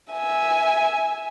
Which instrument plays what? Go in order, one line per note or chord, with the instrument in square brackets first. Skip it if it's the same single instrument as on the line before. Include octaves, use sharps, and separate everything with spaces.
[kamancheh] E5 G#5